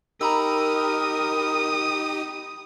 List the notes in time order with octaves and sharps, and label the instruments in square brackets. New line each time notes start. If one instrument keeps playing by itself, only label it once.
[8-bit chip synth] D#4 G4 [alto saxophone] A#4 [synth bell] A#5 B5 E6 [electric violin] D#6